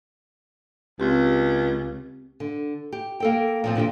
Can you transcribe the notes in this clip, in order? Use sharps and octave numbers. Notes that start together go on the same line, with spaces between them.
C#2 C4 G4
D3
G4
A#3 A4 G5
A#2 F3 C4
A#2 D3 F4 G4